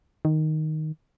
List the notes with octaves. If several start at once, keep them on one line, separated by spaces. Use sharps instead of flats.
D#3